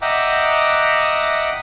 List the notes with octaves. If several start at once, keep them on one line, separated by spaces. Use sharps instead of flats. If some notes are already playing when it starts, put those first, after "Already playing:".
D#5 E5 F#5 G5 A#5 D6